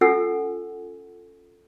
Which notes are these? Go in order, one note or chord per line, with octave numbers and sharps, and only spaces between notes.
C#4 F4 A4 F#5 G#5 E6